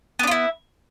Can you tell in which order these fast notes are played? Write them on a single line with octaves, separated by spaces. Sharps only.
B3 D4 F4 E4